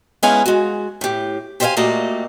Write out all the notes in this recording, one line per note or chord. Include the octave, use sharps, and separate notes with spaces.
G#3 B3 C#4 E4 F5 G#5
G#3 F#4
A2 G4
G4 C5 D5 E5 F5 G#5
A#2 A3 A#3 F#4 G4 D#5